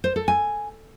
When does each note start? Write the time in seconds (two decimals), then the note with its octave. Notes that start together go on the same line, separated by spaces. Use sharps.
0.04 C5
0.16 A4
0.28 G#5